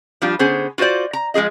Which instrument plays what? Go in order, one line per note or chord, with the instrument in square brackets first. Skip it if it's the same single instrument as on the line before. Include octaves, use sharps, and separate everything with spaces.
[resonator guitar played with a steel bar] F3 G3 D4 F4
D3 B3 C#4 G#4 C5
F4 F#4 B4 C5 D5
A#5
F3 G#3 F4 G#4 D#5